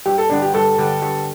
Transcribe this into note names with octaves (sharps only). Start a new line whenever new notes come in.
G2 G4
A4
D3 G3 B3 D4
G4
G2 A4
D3 G3 B3
G2